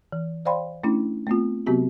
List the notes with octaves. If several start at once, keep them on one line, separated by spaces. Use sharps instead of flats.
E3
C5 D5 F5 G5 B5 C6
A3 C#4 D4 E4
A3 B3 C4 F4
C3 F#3 B3 C4 F#4 G4